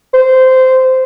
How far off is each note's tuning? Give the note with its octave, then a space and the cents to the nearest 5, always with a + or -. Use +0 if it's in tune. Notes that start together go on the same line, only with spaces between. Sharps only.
C5 -15